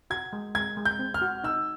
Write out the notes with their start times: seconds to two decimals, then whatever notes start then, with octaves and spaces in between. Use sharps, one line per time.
0.10 F#4 G#6
0.33 G#3
0.55 G#3 G#6
0.77 G#3
0.85 G6
0.99 C4
1.14 F6
1.22 F#4
1.44 D#4 E6